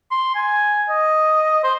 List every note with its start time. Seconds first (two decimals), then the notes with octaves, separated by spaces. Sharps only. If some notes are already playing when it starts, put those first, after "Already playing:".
0.11 C6
0.35 G#5
0.90 D#5
1.64 C5